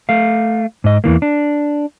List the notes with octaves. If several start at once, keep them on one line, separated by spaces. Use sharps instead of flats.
A3 F5
G#2 D#5
E2 E3 A#3
D4